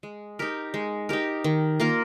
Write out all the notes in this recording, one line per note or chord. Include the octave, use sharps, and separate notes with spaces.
G#3
D#4 G4 A#4
G#3
D#4 G4 A#4
D#3
A#3 F4 A#4